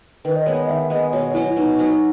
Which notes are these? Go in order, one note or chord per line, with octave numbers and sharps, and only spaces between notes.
D#3 B4
D#5
G#3 B3 C#5
D#5
D#3 E5
G#3 B3 D#5
B2 C#5
F#3 C#4 E4
B2 D#4
F#3 C#4